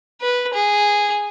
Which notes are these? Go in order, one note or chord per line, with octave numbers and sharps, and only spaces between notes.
B4
G#4